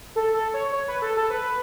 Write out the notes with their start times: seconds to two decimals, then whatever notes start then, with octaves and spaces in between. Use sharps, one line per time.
0.16 A4
0.34 A4
0.54 C#5
0.72 C#5
0.88 B4
1.02 A4
1.17 A4
1.30 B4